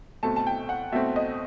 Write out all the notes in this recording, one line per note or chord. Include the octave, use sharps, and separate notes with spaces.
B2 A3 C4 A5
A5
G5
F#5
B2 A3 C4 E5
D#5